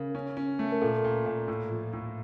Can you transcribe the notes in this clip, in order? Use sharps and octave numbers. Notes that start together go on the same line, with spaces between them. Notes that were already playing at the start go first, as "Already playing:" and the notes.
Already playing: C#3 A#4
C#4
C#4
A3
A#4
A#2 A4
A#2
A#2
A2
F3
A2